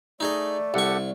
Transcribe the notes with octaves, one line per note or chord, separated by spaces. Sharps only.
A3 D#4 G#4 D5 D#5
C2 G4 A4 F#5 C#6